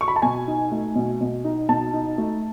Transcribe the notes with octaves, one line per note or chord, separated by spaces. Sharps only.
C#6
B5
A5
B2 G#5
D#4
A3
B2
B2
D#4
B2 A5
D#4
A3